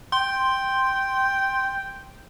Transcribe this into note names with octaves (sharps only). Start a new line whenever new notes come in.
G5 C6